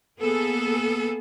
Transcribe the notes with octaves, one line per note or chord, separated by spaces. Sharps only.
A#3 B3 G#4 A4